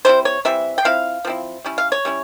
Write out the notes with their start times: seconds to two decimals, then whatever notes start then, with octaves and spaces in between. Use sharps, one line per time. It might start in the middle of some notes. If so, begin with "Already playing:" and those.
0.05 E3 G3 C4 E4 C5
0.25 C#5
0.45 E3 G3 C4 E4 E5
0.78 G5
0.85 F3 C4 E4 F5
1.25 F3 C4 E4
1.64 G3 C#4 E4
1.78 F5
1.92 C#5
2.05 G3 C#4 E4